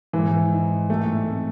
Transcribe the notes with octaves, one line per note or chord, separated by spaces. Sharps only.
G#2 E3
D#4
A2 A3
C4